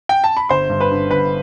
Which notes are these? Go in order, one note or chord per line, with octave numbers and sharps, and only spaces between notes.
G5
A5
B5
G1 C5 C6
G2
B4 B5
D3
G1 B4 B5